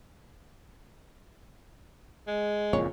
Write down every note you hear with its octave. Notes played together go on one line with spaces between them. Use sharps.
G#3
F#1 F2 A#2 C#5